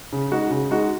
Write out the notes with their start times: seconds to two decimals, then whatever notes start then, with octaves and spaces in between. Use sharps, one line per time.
0.13 C#3
0.31 G#3 D#4 F#4
0.51 C#3
0.70 G#3 D#4 F#4